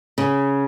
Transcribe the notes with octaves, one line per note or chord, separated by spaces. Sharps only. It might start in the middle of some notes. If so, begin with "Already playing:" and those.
C#3